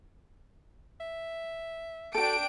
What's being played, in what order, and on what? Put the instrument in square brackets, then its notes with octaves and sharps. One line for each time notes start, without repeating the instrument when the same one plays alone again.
[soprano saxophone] E5
[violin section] D4 G5 D7 [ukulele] F#4 A4